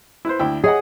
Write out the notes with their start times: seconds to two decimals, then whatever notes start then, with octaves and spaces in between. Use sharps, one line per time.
0.25 E4 B4 C5
0.39 D2 E4 G5
0.64 G#4 C#5 D#5 F#5